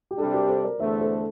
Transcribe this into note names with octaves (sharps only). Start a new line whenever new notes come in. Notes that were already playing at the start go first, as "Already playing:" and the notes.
G4
C3 G3 D4 A4
G4 A#4
A4 C5
A#4 D5
E2 D3 A3 C5 E5
A4 C5